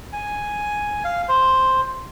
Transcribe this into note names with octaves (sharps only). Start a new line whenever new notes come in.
G#5
F5
C5